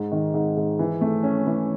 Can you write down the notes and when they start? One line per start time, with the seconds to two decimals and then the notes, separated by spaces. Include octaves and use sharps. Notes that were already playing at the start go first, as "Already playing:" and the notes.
Already playing: G#2
0.12 D#3
0.34 G#2
0.57 G#2
0.79 E3
1.01 A3
1.23 C#4
1.46 E3